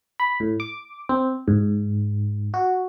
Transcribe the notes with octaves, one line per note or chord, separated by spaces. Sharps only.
B5
A2
D6
C4
G#2
F#4